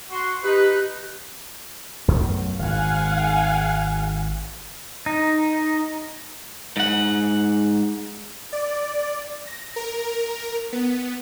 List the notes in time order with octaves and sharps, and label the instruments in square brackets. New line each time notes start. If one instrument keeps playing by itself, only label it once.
[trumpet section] F#4 C6
[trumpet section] D#4 B4 [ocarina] G4
[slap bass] B1 F#2 A3
[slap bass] G#1 G#2 [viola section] F5 F#5 G#5
[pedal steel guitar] D#4
[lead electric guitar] G#2 F#5
[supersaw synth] D5
A#6
A#4
B3